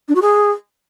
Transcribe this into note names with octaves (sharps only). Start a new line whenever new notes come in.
D4
F#4
G#4